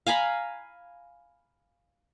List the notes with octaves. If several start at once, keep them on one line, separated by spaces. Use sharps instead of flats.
F5 G#5 A#5 B5